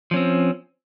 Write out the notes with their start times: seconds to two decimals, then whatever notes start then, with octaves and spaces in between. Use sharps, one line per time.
0.11 F3
0.14 C#4
0.16 C4